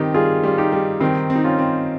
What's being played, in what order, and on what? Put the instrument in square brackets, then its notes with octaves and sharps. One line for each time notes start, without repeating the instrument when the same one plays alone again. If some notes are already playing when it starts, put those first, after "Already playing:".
Already playing: [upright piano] D#3 G3 C4 [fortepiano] D#4 G4
[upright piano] G3 [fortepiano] F4 G#4
[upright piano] G3 [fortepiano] F4
[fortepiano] D#4 G4
[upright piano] G3
[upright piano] D#3 [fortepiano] C4 D#4
[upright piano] C4
[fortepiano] D#4
C#4 F4
[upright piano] C4